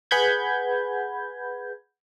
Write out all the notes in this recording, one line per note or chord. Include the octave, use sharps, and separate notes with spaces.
G#4 B4 F#5 B5 G6 G#6